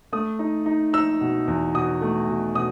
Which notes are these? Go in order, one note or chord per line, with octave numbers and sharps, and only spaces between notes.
A3 D#6
D#4
D#4
D#4 E6
B2
E2
B2 D#6
A3
B2
B2 D#6